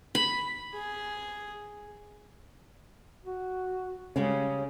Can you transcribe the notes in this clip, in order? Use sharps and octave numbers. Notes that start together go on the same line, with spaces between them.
B5
G#4
F#4
C#3 G3 G#3 C#4 G#4